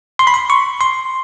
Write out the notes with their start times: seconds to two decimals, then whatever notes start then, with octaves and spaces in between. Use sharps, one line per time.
0.19 C6
0.27 B5
0.34 C6
0.50 C#6
0.81 C6